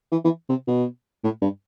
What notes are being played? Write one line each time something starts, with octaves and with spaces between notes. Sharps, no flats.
E3
E3
C3
B2
A2
G2